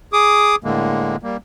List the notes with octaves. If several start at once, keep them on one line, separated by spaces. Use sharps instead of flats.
G#4 D6 D#6
A2 D3 G#3 A#3
G3 A#3